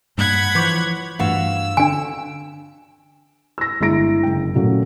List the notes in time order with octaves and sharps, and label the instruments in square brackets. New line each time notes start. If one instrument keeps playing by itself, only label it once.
[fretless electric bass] G2 G3 A#3 [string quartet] F#5 B5 G#6
[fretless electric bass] E3 F3 [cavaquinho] C5 C#5 D6
[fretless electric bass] G2 E3 A3 [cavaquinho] F4 F#4 F5 [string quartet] E6
[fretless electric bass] D3 [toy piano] D4 G#5
[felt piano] E6 A#6
G1 G#3 E4 A#5 A#6 D7
F#1 G5
A#2 C#3 F#3 A3